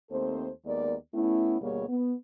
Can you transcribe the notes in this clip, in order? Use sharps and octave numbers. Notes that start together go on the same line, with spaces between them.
D#2 A3 C4 A4 C5
D#2 G#3 B3 A#4 D5
A3 B3 C#4 E4
D2 B2 G3 A#3 G#4 C#5
B3